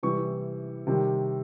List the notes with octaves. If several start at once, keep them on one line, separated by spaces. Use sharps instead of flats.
C3 E3 G3 C#6
C3 D#3 G3